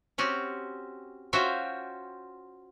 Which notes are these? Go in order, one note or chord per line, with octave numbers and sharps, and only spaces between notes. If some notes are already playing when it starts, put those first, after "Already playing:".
C4 C#4 F#4 G4
C#4 F4 F#4 C5 E5 G5